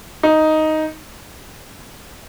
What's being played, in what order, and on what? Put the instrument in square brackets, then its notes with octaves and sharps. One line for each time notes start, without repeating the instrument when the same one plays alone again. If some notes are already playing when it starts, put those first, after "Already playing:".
[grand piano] D#4